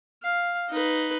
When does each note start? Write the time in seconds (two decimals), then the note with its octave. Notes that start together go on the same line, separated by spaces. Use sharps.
0.23 F5
0.70 D#4 B4